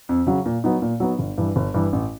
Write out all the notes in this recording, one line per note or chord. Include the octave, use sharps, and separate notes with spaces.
F2
C#3 F#3
A#2
F#3 B3 D#4
A#2
F#3 B3 D#4
G1
G2 E3
G1
G2 E3
A1